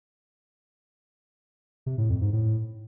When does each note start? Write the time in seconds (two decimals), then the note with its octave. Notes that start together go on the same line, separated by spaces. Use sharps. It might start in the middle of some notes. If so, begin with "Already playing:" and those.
1.86 C3
1.98 A2
2.10 F2
2.21 G#2
2.33 A2